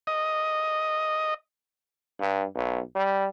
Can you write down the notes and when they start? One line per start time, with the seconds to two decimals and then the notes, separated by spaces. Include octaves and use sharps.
0.07 D#5
2.20 G2
2.55 B1
2.96 G3